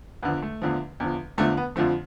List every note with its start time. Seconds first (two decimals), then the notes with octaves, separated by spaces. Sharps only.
0.23 E2 D3 F3 B3
0.42 A3
0.62 E2 D3 F3
1.00 E2 D3 F3
1.38 E2 D3 F3 A3
1.57 B3
1.76 F2 D3 F3 A3